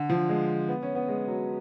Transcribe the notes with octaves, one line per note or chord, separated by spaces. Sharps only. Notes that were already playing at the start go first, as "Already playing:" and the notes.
Already playing: D3
F3
G#3
B3
C#4
B3
G#3
F#3